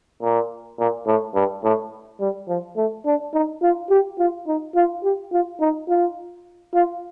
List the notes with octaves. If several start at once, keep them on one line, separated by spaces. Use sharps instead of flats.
A#2
A#2
A2
G2
A2
G3
F3
A3
D4
D#4
F4
G4
F4
D#4
F4
G4
F4
D#4
F4
F4